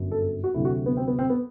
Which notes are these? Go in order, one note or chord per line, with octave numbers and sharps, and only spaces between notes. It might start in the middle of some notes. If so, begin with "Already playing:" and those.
Already playing: G1 F#2 F#3
A4
A4
F#4
D2 C3 F#3 A3 E4
F#4
B3
C4
B3
C4
B3